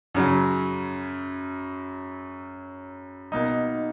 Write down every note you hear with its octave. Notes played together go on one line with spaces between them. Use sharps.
F#2 C#3 F#3
B2 A#3 D#4